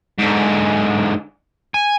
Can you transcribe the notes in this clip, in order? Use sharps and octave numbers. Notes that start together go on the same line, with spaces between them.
G#2 D3
G#5